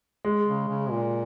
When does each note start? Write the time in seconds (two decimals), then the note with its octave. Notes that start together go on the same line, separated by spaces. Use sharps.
0.25 G#3
0.47 C#3
0.68 C#3
0.90 A#2